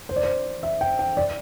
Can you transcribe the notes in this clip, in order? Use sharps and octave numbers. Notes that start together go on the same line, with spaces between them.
C5
D5
C5
E5
G5
G5
D5